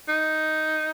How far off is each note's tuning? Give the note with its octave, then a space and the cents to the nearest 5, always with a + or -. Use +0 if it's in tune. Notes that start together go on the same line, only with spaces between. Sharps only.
D#4 +5